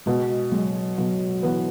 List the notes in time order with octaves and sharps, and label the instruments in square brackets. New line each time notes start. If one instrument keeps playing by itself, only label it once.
[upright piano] B2 [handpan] G#3
[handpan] F#3 [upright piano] G#3
[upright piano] B2 [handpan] F#3
[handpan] E3 [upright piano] B3